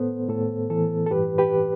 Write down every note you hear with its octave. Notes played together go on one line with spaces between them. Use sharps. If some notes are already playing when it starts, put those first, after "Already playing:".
Already playing: A2 B3 A4 C5
A2 A4
E3 A4
A4
G2 G4 B4
G4 B4